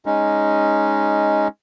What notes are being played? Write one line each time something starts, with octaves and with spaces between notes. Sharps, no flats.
G#3 C#4 D#4